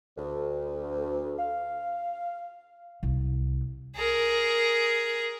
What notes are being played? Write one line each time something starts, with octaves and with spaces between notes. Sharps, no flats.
D2
F5
C2
G#4 A#4